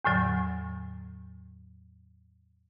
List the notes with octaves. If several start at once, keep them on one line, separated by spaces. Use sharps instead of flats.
E2 A2 D3 F#3